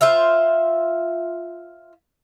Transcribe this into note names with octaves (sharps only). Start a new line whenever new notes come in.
F4 C5 E5 F5